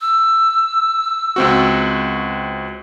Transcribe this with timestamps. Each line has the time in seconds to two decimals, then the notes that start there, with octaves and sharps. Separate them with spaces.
0.01 E6
1.36 C#2 C4 F#4